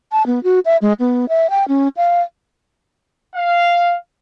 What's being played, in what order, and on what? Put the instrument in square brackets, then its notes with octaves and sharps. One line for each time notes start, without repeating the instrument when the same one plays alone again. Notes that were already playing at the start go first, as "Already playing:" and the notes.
[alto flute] A5
B3
F#4
E5
G#3
B3
E5
G5
C#4
F5
[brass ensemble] F5